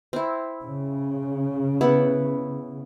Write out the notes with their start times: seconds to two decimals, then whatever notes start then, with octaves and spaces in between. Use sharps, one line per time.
0.13 C4 E4
0.63 C#3
1.81 B3 E4 F#5